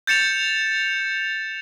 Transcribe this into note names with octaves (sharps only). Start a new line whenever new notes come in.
G6 A6 C#7 E7 F7